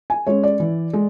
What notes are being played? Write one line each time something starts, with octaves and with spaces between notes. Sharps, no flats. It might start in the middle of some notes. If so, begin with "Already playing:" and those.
G#5
G#3 C#4 C#5
D5
E3
G#3